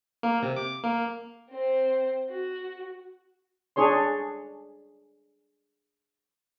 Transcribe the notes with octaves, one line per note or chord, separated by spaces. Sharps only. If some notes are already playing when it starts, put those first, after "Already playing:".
A#3
C3
D6
A#3
C4 C5
F#4
D4 G#4 C#5 C6